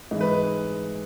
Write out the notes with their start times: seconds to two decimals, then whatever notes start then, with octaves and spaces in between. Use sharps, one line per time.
0.11 G#2 E3 G#3
0.21 B4